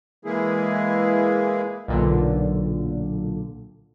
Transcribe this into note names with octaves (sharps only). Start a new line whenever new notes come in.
E3 G#3 A#3 E4 G#4
B1 A#2 D3